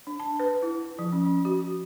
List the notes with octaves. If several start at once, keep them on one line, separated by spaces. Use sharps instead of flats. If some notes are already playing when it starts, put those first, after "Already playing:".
D4
A5
B4
E4
F3
C#4
C#4
F#4